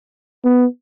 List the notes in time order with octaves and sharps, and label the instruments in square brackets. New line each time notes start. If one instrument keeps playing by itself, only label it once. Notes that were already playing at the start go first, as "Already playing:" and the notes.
[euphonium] B3